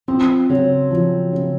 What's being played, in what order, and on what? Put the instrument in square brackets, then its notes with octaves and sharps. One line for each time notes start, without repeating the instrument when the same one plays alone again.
[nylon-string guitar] F3 [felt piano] C4
[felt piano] C#3 [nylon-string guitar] F#3
[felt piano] F3
C#3